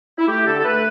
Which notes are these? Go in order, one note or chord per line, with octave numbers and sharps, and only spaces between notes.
E4
A3 G4
D3 A4
A4
A3 B4